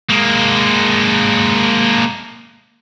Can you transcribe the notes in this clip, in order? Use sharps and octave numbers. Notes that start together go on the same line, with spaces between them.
G#3 A#3